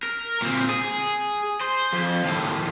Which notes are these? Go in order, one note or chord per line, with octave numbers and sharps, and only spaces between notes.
A#4
A#2 C4
G#4
C5
F2
D#2 A2